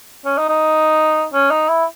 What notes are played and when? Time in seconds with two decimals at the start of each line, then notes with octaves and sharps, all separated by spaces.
0.25 C#4
0.38 D#4
0.49 D#4
1.33 C#4
1.50 D#4
1.68 E4